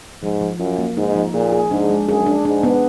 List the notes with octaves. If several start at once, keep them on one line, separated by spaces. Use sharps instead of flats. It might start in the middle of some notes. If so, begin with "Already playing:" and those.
G#2 F3
F3
F#2 F4
A#3
G#2 D#4
F3
A#2 G#4
G#4
G#2 D4
G#3
F#2 G#4
D4
G#2 D4
B3